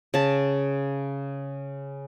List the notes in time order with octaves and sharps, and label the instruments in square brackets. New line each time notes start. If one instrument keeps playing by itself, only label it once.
[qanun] C#3 A5